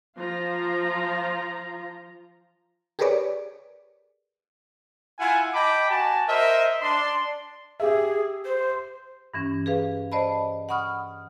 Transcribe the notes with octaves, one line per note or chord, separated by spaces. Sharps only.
F3 F4 A#5
G4 G#4 A#4 B4 C#5 D5
E4 F4 F#5 G#5
D#5 G5 A5 B5 D6
F#4 G#5 A5
A#4 C5 D#5 E5
D4 C6
G4 G#4 E5
C5
G2 E3 C#4
G#4 B4 F5
C5 D5 D#5 A5 B5
F#5 B5 C#6 D#6 F6